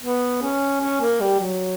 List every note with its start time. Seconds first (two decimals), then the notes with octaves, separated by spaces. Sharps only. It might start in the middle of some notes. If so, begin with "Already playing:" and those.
0.02 B3
0.42 C#4
0.81 C#4
1.01 A#3
1.20 G3
1.40 F#3